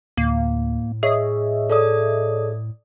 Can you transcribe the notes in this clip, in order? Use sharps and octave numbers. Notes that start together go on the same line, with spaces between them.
D2 A2 A#3
G#4 C#5 D#5 E5
A4 D5 D#6